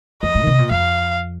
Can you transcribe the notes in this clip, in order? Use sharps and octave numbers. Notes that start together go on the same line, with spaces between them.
F2 D#5
G#2
D#3
C3
A#2
F2 F5